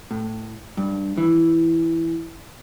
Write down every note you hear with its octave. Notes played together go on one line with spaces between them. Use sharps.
A2
G2
E3